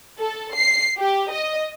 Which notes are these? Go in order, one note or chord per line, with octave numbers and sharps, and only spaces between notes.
A4
C7
G4
D#5